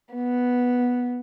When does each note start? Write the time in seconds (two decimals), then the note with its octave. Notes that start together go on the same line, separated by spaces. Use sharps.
0.14 B3